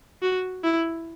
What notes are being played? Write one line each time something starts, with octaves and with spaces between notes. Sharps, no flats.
F#4
E4